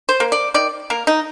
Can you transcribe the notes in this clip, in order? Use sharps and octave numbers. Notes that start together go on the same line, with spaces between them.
C5
A#3
D5
D#3 D5
A#3 A#4
D#4